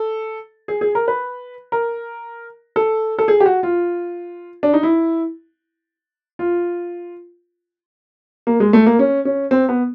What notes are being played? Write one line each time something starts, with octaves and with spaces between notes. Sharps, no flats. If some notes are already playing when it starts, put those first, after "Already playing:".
Already playing: A4
G#4
G#4
A#4
B4
A#4
A4
A4
G#4
G4
F#4
F4
D4
D#4
E4
F4
A#3
G#3
A3
A#3
C#4
C#4
C4
B3